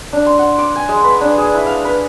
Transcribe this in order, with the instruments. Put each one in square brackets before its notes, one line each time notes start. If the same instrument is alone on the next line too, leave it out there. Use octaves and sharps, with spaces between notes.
[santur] D4
C6
F#5
D6
G#5
G#3
B4
D4
G#4
E4
F5
B4